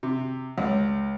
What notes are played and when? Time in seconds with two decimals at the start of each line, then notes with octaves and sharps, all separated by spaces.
0.03 C3
0.58 C#2